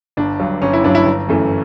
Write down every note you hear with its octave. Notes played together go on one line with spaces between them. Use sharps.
G1 D4
G2 F#3
G1 C#4
E4
G2 F#3 D4
E4
G1
F#2 E3 A3